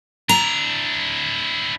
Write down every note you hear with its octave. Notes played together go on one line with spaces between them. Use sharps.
D4 E4 A#5